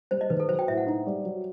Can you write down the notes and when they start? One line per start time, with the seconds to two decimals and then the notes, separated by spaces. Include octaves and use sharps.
0.11 G3 C5
0.21 D#5
0.30 D#3 B4
0.40 A4
0.48 F#3 C5
0.59 G5
0.68 A2 E5
0.77 F#5
0.86 D#4
1.07 G3
1.24 F#3